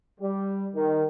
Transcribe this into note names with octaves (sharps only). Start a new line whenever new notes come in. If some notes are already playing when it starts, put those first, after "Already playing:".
G3
D#3